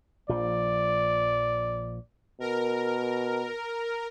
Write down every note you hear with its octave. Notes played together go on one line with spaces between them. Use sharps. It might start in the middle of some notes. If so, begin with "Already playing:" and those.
A#1 F3 D5
B2 A#4